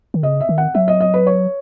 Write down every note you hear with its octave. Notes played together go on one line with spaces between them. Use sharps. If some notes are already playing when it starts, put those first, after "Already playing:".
D#3
C#3 D#5
E5
D#3
F#5
F#3 E5
D#5
D#5
B4
C#5